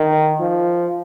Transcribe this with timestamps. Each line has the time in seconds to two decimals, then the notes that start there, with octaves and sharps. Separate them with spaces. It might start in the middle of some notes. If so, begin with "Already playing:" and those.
Already playing: D#3
0.40 F3